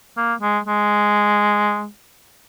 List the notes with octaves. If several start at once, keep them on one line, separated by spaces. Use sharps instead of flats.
A#3
G#3
G#3